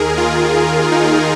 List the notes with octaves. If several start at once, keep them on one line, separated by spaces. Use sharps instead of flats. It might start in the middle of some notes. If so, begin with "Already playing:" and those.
Already playing: D#2 D#3 G#4 A#4
F4
D#4